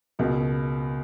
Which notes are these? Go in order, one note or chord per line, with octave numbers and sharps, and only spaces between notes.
C#2 B2 A#3